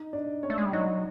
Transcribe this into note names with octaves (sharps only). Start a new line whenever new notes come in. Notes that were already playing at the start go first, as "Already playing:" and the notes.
Already playing: D#4 D#5
D4 D5
C#4 C#5
A3
G#3
G3
F#3 D#4 D#5